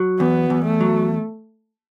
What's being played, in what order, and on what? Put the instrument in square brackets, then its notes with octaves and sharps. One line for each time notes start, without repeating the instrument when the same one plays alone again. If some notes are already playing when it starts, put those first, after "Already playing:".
Already playing: [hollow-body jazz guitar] F#3
[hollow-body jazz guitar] E2 [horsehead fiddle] B3
[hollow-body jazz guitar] E2
[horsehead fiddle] A3
[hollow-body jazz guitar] F#3